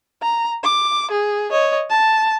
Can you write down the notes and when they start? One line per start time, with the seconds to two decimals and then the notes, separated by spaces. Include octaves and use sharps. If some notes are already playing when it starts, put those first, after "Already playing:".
0.22 A#5
0.63 D6
1.11 G#4
1.51 C#5 D#5
1.90 A5